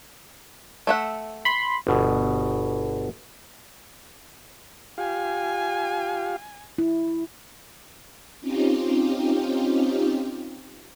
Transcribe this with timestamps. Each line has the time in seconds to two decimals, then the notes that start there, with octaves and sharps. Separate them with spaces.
0.87 A3 E5 F#5
1.45 B5 C6
1.87 G1 B2
4.98 F4 G4 F5 G#5
6.78 E4
8.41 C4 C#4 D#4 F4 G4